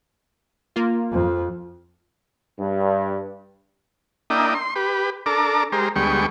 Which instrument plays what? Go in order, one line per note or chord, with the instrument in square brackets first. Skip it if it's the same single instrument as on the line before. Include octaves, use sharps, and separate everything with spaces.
[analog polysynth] A#3 F4
[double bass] F2
[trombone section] G2
[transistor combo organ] A#3 D4 E4 D#5 G5
C6
G4 B4
D4 A4 A#4 D6
G#3 G4 A#4 C5
D2 G3 G#3 B3 G5 C#6